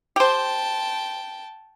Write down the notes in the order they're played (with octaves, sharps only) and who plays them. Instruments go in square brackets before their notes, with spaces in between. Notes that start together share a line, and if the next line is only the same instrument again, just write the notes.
[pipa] G4 C5 [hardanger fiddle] G5 A5